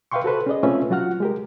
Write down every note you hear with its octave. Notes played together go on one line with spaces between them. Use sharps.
B4 E5 F5 G5 C6 C#6
F#4 A4 B4 C5
C#4 G#4 D5 D#5
A3 C4 C#4 F4 B4 E5
F#3 F4 F#4 F#5 F6
G#3 G4 A#4